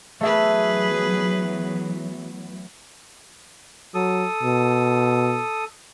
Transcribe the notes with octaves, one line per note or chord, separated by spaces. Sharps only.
E3 F#3 A3 B3 G#4 B4 E5
F#3 A4 D#6
B2